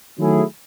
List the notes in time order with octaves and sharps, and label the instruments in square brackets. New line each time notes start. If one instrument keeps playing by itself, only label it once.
[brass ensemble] D#3 F#3 A3 E4 G#4